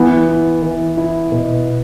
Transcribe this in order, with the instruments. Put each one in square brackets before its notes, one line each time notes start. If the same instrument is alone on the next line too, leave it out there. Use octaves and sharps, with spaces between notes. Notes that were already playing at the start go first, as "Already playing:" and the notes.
Already playing: [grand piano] E3 [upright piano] B3
[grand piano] E4
E3
E4
B2